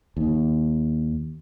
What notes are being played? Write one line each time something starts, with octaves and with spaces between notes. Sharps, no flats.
D#2